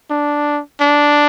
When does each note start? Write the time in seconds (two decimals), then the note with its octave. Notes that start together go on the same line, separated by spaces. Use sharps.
0.10 D4
0.81 D4